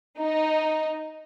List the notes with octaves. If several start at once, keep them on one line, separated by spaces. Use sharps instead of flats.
D#4